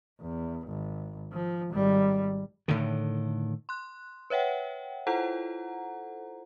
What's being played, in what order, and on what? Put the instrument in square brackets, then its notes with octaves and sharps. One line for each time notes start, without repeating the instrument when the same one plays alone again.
[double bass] E2
G#1
F3
G#1 G3
[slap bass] A2 D3 D#3
[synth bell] C6 F#6
B4 C#5 E5 F#5 G5
E4 F4 A4 C5 F#5 A#5